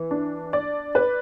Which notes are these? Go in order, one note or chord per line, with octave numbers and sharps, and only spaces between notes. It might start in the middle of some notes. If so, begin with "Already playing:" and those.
Already playing: E3
D4
D5
B4